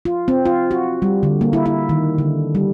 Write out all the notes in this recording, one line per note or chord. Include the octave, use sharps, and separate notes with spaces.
F4
C4
F4
F#4
G3
D3
A#3
E4
E4
D#3
D3
G3